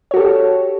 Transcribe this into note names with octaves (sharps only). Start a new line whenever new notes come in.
F#4 G4 A4 C#5